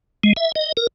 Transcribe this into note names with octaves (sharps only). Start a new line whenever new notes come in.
G#3
E5
D#5
A#4